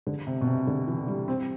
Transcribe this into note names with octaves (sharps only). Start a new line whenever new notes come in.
D3
C3
B2
C3
D3
E3
G3
C4